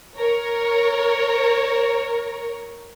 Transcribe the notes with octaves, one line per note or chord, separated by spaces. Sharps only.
A#4 C#5